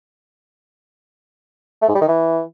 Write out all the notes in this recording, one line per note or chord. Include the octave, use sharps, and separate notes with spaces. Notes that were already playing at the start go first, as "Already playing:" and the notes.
A3
G#2
G3
D#3
E3